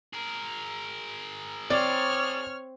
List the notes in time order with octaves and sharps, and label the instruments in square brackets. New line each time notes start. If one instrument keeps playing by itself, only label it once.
[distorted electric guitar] G#4 A#4
[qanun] C4 [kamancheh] C#5 F6 [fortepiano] D5